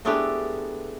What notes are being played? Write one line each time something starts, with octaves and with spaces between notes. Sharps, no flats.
G#3 A3 B3 D4 E4 G4